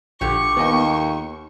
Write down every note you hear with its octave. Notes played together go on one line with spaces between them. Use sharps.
A#1 A#2 D3 G4 C#6
D#2 B3 D#5 G5